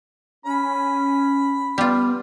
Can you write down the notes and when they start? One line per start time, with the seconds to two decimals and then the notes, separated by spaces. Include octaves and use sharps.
0.46 C#4 B5
1.78 G3 B3 F4